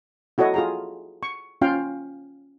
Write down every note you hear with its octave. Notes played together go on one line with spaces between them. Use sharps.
E4 F#4 A4 C#5 D#5
F4 G#4 A#5
C#6
C#4 F4 F5 G5